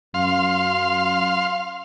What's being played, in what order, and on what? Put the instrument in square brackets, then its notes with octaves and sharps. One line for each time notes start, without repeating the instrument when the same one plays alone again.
[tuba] F#2 [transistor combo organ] F5 C6